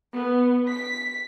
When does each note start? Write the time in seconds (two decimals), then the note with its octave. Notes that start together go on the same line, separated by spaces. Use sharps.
0.15 B3
0.71 B6